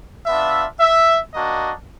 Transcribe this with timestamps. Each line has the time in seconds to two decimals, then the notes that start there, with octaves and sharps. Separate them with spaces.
0.26 B3 D4 F4 E5
0.80 E5
1.34 A#3 D4 F#4 D#5